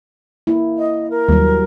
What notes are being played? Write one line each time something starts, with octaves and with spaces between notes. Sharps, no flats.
A#3 E4
D#5
A#4
D#2 F#3 G3